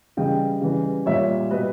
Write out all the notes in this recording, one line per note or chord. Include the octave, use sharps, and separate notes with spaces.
C#3 E3 G3 D#5 G5
C#3 E3 G3
A#2 G3 C#5 E5
B2 G3 B4 D#5